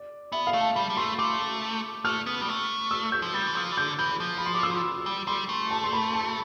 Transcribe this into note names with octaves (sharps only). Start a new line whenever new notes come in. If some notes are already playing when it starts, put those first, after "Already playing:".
Already playing: D5
B3 E5
F5
A3
A5
G3 B5
G3
A3 C6
A3 D6
A3 F6
B3
G3
A3
E6
G6
F3
G3 A6
E3
F3 G6
E3
D3 G6
E3 G6
F3
B5
C6
D6
E6
G3
G3 C6
A3
A5
C6
B5
A5